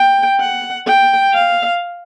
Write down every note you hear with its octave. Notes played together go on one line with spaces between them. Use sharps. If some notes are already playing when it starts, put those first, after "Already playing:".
Already playing: G5
F#5
G5
F5